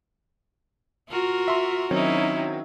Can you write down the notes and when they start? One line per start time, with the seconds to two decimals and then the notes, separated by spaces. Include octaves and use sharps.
1.09 F4 F#4 A#4
1.48 E5 C6
1.91 D#3 F#3 C4 C#4 D#4 E4